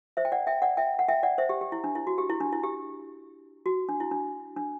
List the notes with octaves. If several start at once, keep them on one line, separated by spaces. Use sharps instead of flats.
C5 E5
G5
D5 F#5
E5 G5
D5 F#5
E5 G5
F#5
E5 G5
D5 F#5
C5 E5
G4
G4
E4
D4
E4
F#4
G4
E4
D4
E4
G4
F#4
D4
E4
D4
D4